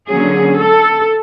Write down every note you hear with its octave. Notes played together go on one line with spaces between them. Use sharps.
D3 F#3 A#3 C#4 G#4
A4